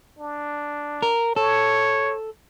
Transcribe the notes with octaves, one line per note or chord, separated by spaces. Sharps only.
D4
A#4
A4 C#5